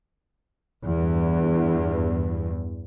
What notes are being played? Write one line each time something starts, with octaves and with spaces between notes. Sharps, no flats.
E2 G2